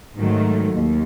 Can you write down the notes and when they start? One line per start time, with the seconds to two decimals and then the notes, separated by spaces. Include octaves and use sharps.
0.17 G#2 D#3 F#3 A3
0.75 D#2